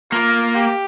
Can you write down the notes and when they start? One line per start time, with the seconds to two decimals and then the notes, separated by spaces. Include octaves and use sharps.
0.12 A#3 F4
0.55 G4